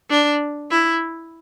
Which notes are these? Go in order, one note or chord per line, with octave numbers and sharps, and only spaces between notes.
D4
E4